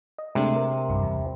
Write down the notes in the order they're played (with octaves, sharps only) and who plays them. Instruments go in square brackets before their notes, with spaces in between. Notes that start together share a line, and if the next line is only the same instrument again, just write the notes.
[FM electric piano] D#5
[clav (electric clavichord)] C3 [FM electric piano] G#3 A3 D4
[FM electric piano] A#4
B1 G2
E2